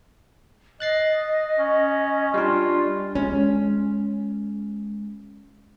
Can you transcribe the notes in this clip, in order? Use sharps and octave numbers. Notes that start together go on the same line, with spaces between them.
D#5 F#6 A6 C7
C#4
G3 D4 F4
G#3 C#4